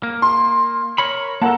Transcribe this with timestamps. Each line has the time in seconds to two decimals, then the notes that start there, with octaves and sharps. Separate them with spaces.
0.03 A#3
0.22 C6
0.98 A#4 C#5 B5
1.42 A#3 A4 A#4 F#5 A5